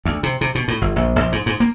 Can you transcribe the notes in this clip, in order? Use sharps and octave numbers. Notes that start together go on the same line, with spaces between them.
D2
C3
C3
B2
A2
G1
A#1
A#1
G#2
G#2
A#3